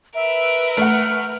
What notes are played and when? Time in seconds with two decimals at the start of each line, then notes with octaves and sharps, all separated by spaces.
0.15 A#4 B4 E5
0.77 A3 E5 F#5 F6